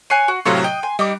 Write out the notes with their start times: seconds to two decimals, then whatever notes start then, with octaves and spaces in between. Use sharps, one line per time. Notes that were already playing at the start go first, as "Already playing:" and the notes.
0.10 C#5 G#5 F#6 C7 D#7
0.28 F#4
0.45 A2 C3 F#3 F4 A4 C#6
0.64 D#5 G5
0.83 G#5 C6
0.99 G3 D#4 D6